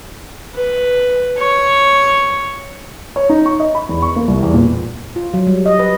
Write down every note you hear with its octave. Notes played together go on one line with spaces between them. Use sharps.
B4
C#5
C#5
D#4
C#6
D#5
B5
E2
C#6
A#3
C2
E2
A#2
F4
F#3
G3
D#5
B4